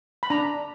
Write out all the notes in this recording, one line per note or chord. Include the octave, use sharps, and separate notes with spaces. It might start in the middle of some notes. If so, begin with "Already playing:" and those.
B5
D4 A#5